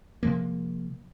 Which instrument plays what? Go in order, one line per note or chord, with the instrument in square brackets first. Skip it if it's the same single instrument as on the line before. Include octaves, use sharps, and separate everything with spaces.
[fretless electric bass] C3 F3 G#3 A#3